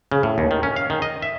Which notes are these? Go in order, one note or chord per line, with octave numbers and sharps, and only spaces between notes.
C#3
A2
D#2
D#3
C#4
F5
D#3
D#5
E5